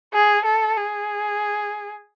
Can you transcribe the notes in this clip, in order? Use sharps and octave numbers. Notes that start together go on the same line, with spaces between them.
G#4
A4
G#4